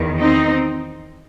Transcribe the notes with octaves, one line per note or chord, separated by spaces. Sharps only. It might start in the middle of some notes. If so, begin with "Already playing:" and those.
Already playing: E2 D#3
C4 D#4